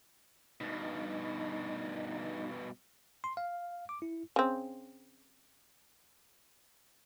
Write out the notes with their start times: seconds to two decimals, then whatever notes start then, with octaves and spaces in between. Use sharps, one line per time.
0.61 G2 B2 D#4
3.24 C6
3.37 F5
3.89 D6
4.02 E4
4.36 C#3 C4